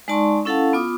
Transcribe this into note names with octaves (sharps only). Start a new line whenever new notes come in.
G#3 D#4 D5 A5 C6 C#6
C#4 E4 A4 F5 F#5 A5
B3 F4 D6 D#6